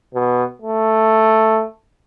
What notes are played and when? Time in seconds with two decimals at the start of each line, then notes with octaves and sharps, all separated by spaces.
0.14 B2
0.62 A3